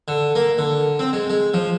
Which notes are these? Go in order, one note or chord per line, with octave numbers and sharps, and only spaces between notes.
D3
A#3
D3
C4
G#3
G#3
F3